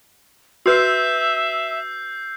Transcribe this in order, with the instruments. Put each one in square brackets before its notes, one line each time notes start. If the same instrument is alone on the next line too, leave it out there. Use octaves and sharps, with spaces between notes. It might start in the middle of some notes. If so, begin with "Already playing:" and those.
[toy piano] F#4 B4 [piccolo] E5 [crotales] E6 G6 C7